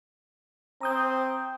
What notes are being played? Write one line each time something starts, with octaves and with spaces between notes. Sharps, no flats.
C4 A#5 D#6 G6